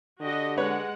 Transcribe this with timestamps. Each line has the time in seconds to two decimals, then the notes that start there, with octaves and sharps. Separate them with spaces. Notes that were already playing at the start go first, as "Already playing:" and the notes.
0.21 D3 F#4 G4 D#5
0.57 G#3 B4 C#5 F#5